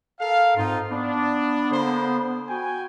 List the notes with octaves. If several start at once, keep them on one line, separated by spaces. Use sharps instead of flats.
A4 A#4 F5
G#2 C4 D#4 F4
B3 D4
D3 A#3 C5
F#4 G5 G#5